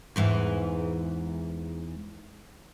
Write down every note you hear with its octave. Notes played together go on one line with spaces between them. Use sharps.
E2 G#2 E3